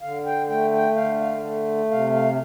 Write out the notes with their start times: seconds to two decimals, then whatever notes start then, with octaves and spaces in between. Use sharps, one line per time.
0.01 D3 F5
0.26 G5
0.49 A3 G5
0.73 G5
0.96 D3 F5
1.20 F5
1.44 A3
1.91 C3 F5
2.15 F5